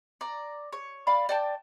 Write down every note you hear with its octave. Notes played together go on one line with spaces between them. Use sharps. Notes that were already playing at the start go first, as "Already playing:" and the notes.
D5 A#5
C#5
D5 F5 B5
D5 G5 A5